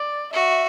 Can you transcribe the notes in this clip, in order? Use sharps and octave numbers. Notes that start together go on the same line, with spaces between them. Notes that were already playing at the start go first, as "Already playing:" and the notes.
Already playing: D5
F#4 E5